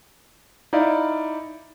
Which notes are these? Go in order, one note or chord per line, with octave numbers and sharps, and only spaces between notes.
D#4 E4 D5 F5